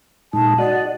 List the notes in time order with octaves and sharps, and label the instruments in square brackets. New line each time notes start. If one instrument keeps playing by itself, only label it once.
[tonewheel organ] A#2 G#3 D#4 [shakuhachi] A5
[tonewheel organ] F#4 D#5 F#5 [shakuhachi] D5